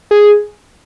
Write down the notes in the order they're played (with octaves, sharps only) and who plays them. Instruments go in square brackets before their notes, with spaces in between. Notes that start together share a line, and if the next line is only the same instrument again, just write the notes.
[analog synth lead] G#4